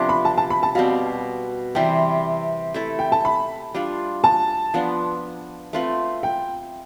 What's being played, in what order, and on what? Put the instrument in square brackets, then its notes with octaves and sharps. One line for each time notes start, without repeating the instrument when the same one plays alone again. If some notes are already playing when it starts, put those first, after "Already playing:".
Already playing: [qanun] C3 F3 B3 D4
[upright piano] B5
A5
A5
B5
A5
[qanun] B2 G3 C4 [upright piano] F5
[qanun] C3 E3 G3 C4 [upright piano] G5
[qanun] A3 E4 A4
[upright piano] G5
A5
B5
[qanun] G3 D4 F4
[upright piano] A5
[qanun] F3 B3 D4
A3 C4 F4 B4
[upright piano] G5